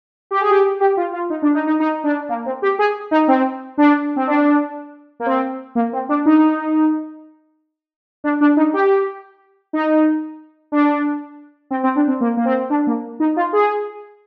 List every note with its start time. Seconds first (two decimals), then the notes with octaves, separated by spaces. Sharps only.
0.31 G4
0.41 G#4
0.50 G4
0.80 G4
0.97 F4
1.13 F4
1.30 D#4
1.42 D4
1.54 D#4
1.67 D#4
1.80 D#4
2.04 D4
2.29 A#3
2.46 C4
2.62 G4
2.79 G#4
3.11 D#4
3.28 C4
3.78 D4
4.16 C4
4.27 D4
5.20 A#3
5.26 C4
5.75 A#3
5.93 C4
6.09 D4
6.26 D#4
8.24 D4
8.41 D4
8.57 D#4
8.73 G4
9.73 D#4
10.72 D4
11.71 C4
11.84 C4
11.96 D4
12.08 C4
12.21 A#3
12.37 A#3
12.45 C4
12.70 D4
12.87 A#3
13.20 D#4
13.36 F4
13.53 G#4